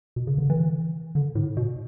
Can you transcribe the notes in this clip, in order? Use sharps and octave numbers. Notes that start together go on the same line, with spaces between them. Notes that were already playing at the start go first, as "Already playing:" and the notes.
B2
C#3
D3
E3
D3
A2
B2